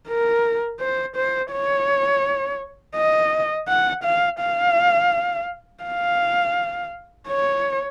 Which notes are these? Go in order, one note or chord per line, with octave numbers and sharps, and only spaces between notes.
A#4
C5
C5
C#5
D#5
F#5
F5
F5
F5
C#5